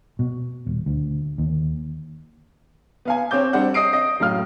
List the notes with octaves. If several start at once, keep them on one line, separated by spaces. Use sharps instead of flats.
B2
D#1
D2
D#2
B3 F5 G#5
C4 C#5 D6 G6
G3 C4 D4 F#5
D#5 D#6 C7 D7
D#5
F#2 A2 F5 F6